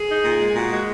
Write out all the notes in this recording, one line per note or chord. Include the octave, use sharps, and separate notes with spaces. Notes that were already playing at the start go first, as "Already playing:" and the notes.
Already playing: G#4
D#4
A#2
G#3
A#2 F#4
G#3 F#4